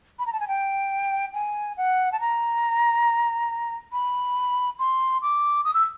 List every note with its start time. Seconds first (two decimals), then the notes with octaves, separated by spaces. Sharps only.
0.19 B5
0.26 A#5
0.33 A5
0.40 G#5
0.48 G5
1.34 G#5
1.77 F#5
2.12 A5
2.20 A#5
3.92 B5
4.79 C6
5.22 D6
5.65 D#6
5.74 E6